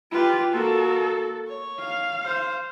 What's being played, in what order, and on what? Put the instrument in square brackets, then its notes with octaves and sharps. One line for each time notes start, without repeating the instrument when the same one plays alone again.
[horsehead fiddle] F4 G4 [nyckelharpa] B4
[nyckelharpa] A#3 F#4 [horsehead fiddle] A4
[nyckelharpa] C#5
[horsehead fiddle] F5
[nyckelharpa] C5